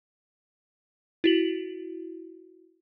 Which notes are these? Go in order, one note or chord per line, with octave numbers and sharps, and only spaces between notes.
E4 F#4 F#7